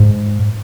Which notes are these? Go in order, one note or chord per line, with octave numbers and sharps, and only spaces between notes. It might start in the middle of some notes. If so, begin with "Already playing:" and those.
Already playing: G#2